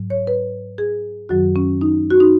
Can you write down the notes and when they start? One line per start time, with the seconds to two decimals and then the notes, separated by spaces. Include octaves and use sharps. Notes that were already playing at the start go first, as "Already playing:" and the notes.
Already playing: G#2 F#3
0.10 C#5
0.27 B4
0.78 G#4
1.29 F#2 D#3 F#3 F#4
1.56 C#4
1.81 D#4
2.10 F#4
2.20 D#4